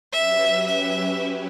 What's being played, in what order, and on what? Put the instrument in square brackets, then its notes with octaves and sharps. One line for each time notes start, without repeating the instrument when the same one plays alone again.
[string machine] F#3 C#4 G4 B4 [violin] E5
[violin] E5